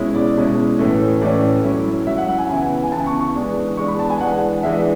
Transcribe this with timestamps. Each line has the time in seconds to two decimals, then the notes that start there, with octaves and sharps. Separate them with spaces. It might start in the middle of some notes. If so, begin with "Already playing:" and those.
Already playing: B2 G#3 C#4 E4
0.15 D5
0.36 B2 G#3 C#4 E4
0.78 A2 E3 A3 C#4
1.21 A2 E3 A3 C#4 D5
1.64 F#3 C#4 E4
2.07 F#3 C#4 E4 E5
2.18 F#5
2.28 F#5
2.39 G#5
2.49 C#3 E3 B3 E4 G#5
2.84 G#5
2.92 C#3 E3 B3 E4 A5
3.07 C#6
3.21 C#6
3.35 E3 G#3 B3 D4
3.77 E3 G#3 B3 D4 C#6
3.88 B5
3.99 A5
4.10 G#5
4.21 E3 G#3 D4 F#5
4.63 E3 G#3 D4 E5